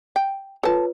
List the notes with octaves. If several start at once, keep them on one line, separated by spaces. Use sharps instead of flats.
G5
F4 A4 B4 C#5 A5